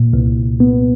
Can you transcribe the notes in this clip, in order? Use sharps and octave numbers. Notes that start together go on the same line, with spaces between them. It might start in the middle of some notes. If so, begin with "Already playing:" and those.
Already playing: A#2
C2
B3